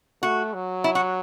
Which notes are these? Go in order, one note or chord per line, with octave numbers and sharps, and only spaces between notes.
A3 F#4
F#3
E4
F#4